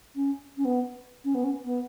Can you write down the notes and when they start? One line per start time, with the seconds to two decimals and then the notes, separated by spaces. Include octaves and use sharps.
0.15 C#4
0.57 C#4
0.65 B3
1.24 C#4
1.35 B3
1.44 C#4
1.65 B3